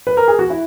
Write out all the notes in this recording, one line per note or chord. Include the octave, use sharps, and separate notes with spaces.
B4
A#4
G#4
F#4
E4